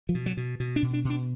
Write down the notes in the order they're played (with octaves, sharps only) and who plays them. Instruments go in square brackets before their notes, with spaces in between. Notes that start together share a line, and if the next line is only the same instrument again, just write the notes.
[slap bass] F3
B2
F#3
B2
B2
D4
B2
D4
B2
D4